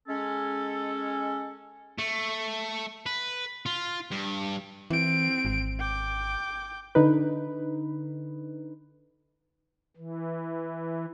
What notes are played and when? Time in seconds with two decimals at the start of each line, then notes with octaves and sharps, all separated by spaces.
0.08 G#3 C#4 A4
1.99 A3
3.06 B4
3.66 F4
4.11 G2
4.90 E3 C4 D7
5.45 G#1
5.79 G5 D6
6.95 D3 D#4 B4
9.97 E3